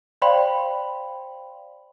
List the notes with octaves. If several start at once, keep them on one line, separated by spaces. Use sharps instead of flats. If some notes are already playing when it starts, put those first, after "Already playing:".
C5 D5 F5 G5 B5 C6